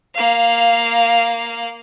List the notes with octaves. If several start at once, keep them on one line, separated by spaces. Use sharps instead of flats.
A#3 F5